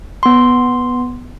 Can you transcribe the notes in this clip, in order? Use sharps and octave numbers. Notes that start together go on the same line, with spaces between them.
B3 C6